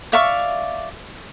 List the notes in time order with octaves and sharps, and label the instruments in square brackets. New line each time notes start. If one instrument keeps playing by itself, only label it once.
[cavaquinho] D5 E5 F5 C#6